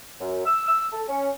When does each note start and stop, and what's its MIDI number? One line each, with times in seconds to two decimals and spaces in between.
0.20 0.45 42
0.46 0.66 88
0.67 0.86 88
0.93 1.03 69
1.08 1.29 61